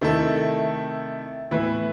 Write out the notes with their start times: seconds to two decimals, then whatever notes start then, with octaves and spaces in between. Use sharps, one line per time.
0.01 C3 D#3 A3 E4 A4
1.51 A2 E3 B3 E4 B4